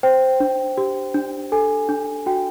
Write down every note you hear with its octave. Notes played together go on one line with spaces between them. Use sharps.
C5 G5
D4
G4
D4
A4 G#5
D4
F#4 G5